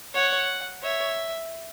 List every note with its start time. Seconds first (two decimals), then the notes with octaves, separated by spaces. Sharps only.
0.14 C#5 F#5
0.83 C#5 E5